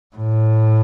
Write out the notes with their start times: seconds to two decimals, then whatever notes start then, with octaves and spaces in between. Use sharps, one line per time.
0.16 A2